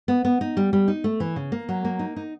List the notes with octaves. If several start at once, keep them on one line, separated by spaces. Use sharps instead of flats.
B3
B3
D#4
G3
G3
D#4
A3
E3
C#3
A#3
F#3
A#3
D#4
D#4